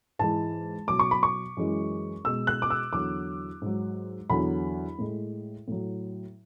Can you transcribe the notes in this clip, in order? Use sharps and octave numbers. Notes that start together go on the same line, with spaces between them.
G#2 E3 G#3 A5
B2 F#3 D6
C#6
B5
C#6
F#2 E3 G#3
B2 G#3 E6
F#6
D6
E6
E2 D3 F#3 D6
G#2 F#3
E2 D3 F#3 B5
A2 G#3
A2 F#3